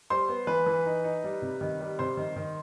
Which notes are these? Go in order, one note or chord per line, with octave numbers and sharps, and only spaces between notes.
G3 C5 C6
B3
E3 B4 B5
E3
D#4
D#4
G3
C3
D#3
G3
C3 C5 C6
D#3
D#3